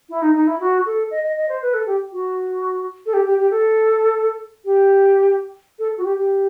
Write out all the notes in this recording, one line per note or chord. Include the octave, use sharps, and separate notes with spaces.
E4
D#4
D#4
E4
F#4
A4
D#5
D#5
D#5
C5
B4
A4
G4
F#4
A4
G4
G4
G4
A4
G4
A4
F#4
G4
G4